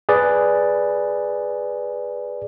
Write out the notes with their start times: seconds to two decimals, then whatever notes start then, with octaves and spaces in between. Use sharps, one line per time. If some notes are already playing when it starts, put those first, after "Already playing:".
0.09 G#4 B4 D5